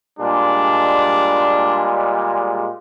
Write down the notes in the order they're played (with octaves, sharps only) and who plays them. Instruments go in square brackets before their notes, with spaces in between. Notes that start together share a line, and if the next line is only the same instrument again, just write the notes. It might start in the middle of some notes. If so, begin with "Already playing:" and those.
[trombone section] A#2 G3 G#3 [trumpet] D4